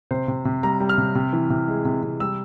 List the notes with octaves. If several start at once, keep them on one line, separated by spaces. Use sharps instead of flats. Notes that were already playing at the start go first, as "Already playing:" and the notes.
C3 C5
C3
C3
G3 A#5
G3
F6
C3
C3
E3
C3
G#3
C3
C3
G3 E6